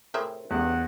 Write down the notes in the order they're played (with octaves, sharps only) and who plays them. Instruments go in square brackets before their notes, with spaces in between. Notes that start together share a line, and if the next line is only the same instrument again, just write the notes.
[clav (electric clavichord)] A2 C3 G#4 [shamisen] A#4 C5 E5
[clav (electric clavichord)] A1 G2 [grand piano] E2 [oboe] F#5